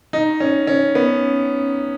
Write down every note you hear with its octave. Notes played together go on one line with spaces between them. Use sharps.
D#4
C#4
C#4
B3